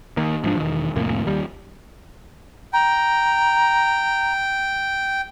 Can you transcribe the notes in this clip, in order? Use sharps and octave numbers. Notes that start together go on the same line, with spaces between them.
D#3 A#3
G#2 F3 D4
E1 D#3
C2 F2 A2 A#3
D#2 G3
G5 A#5